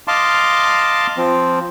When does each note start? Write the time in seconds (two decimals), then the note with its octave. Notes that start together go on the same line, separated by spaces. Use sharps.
0.08 D#5 F5 A5 C6 D6
1.17 F3 C4